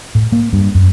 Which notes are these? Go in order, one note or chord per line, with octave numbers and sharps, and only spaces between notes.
A2
A#3
G2
F#2